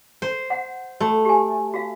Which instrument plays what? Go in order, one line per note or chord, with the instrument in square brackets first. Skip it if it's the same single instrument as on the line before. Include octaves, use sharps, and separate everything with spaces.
[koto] C5
[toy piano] F#5
[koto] A3 [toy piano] F#4
[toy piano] G4 G#5
F#4 F5